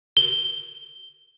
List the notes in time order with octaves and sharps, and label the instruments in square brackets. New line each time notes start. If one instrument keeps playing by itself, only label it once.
[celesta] G7